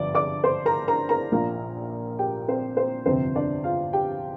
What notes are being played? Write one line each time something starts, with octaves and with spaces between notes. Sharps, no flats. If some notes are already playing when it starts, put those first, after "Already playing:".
Already playing: G1 G2 F3 D5 D6
D5 D6
C5 C6
A#4 A#5
A#4 A#5
A#4 A#5
A#1 A#2 A#3
G4 G5
C4 C5
C4 C5
G1 F2 C3 C4 C5
D4 D5
F4 F5
G4 G5